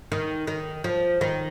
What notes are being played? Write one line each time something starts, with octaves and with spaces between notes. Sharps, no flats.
D#3
D#3
F3
D#3